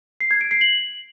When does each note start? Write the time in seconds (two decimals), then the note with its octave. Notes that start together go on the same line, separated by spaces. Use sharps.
0.21 C7
0.31 G#6
0.41 D7
0.51 C7
0.61 F#7